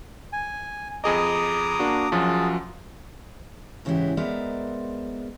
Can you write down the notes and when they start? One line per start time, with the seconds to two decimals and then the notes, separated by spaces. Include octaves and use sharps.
0.33 G#5
1.04 F2 G#4 D#5 A#5 D6 D#6
1.79 A#3 D4 F#4
2.12 F#2 F3 F#3 G#4 A5
3.85 G#2 C#3 E3 E4 F#4 G4
4.17 G#3 B3 A#4 C5 D5 E5